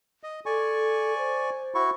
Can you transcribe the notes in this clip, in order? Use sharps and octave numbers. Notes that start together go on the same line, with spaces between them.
D#5
A4 D5 G#5 C#6
C5
E4 F#4 C#6